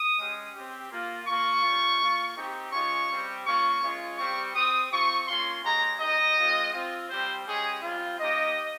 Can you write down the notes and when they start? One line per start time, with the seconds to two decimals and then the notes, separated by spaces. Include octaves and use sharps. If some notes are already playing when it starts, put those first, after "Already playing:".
Already playing: D#6
0.17 G#3 C#4 G4
0.54 C4 G4
0.91 A#3 F4
1.27 A#3 F4 C#6
1.63 G3 C#4 F4
1.99 A#3 F4
2.36 C4 D#4 G4
2.72 G#3 C#4 F4 C#6
3.09 G3 C4 G4
3.45 A#3 C#4 F4 C#6
3.81 G#3 C#4 F4
4.18 G3 C4 G4 C#6
4.54 C4 G4 D#6
4.91 C4 F4 C#6
5.27 A#3 C#4 F4 C6
5.64 G#3 C#4 G4 A#5
6.00 G#3 D#4 G4 D#5
6.37 G#3 C4 F4
6.73 C4 F4
7.09 G3 C4 G4 C5
7.46 G#3 C#4 G4 G#4
7.82 G3 C4 F4
8.18 A#3 D#4 G4 D#5